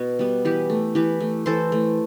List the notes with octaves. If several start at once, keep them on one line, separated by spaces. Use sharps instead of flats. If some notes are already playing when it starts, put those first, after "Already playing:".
Already playing: B2 B4
G3 B3
E3 G4 B4
A3
E3 G4 B4
A3
E3 A4 C5
A3